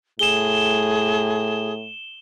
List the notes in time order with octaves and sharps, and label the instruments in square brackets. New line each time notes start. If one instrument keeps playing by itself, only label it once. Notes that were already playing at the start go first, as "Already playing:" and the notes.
[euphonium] A2 [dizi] G#4 [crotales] E7 G7